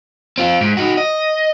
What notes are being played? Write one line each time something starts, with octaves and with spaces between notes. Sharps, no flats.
C4 F4
G#2
D#4 F#4
D#5